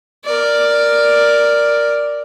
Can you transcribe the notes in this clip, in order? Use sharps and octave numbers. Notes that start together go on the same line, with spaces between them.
A#4 D5